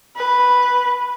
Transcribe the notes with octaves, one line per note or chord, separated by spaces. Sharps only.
B4